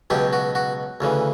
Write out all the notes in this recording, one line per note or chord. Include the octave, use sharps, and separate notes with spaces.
C#2 B2 F#3 G4
F#4
F#4
D2 C#3 E3